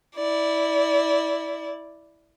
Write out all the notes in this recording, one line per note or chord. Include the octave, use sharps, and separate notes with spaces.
E4 D5